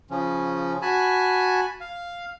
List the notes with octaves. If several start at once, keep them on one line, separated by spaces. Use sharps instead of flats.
C#3 F3 C#4
F#4 G#5 A5 B5
F5